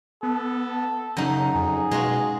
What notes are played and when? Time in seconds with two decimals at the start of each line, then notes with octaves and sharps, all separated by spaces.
0.23 B3 A4
1.17 F#2 C#3 D#4
1.55 F2 G#4
1.91 B2 G#3 F4 F#4